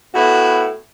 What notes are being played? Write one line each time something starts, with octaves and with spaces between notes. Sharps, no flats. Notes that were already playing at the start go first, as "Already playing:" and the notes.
A2 B3 E4 F#4